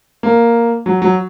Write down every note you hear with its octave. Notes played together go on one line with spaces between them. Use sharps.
A#3
F#3
F#3